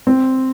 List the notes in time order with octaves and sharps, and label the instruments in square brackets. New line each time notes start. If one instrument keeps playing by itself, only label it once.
[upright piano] C4